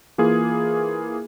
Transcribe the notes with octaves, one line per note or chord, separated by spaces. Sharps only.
E3 A#3 F4 G#4